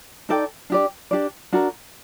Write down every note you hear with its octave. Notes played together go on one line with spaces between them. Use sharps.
D#4 A4 D5 G5
D4 G4 D5
D4 G4 D5
D4 F#4 A#4